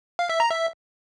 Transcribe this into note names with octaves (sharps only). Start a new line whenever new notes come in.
F5
E5
A#5
E5